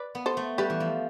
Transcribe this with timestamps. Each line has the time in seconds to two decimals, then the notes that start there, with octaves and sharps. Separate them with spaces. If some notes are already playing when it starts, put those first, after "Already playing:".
Already playing: B4 D5
0.15 B3
0.26 A4 C5
0.37 A3
0.58 G3 G4 B4
0.70 E3
0.80 F3